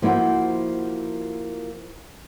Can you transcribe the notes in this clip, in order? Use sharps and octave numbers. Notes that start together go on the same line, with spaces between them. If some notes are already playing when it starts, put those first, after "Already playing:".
F3 A#3 E4 F#4 C5